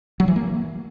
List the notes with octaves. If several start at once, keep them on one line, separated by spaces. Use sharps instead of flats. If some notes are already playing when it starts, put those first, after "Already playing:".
F#3
E3
A#3